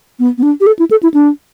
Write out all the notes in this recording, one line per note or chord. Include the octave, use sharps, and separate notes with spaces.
B3
B3
D4
G4
A4
E4
A4
E4
D4